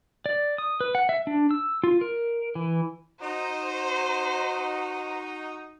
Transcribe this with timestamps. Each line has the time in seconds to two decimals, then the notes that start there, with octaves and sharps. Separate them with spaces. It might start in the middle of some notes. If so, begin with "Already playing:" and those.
0.26 D5
0.58 D#6
0.81 B4
0.95 F#5
1.09 E5
1.27 D4
1.51 E6
1.84 F4
2.01 A#4
2.55 E3
3.22 D#4 F#4 C5 A#5